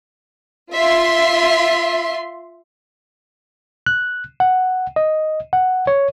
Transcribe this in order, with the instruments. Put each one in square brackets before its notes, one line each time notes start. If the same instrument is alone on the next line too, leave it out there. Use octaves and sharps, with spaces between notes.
[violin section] F4 E5 C6
[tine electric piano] F#6
F#5
D#5
F#5
C#5